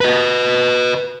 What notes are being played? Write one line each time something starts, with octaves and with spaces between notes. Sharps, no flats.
B4 D#5